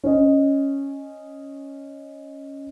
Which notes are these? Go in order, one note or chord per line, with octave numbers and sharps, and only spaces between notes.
C#4 D#5